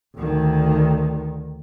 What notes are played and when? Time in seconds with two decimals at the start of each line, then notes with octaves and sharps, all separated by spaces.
0.16 D2 D#3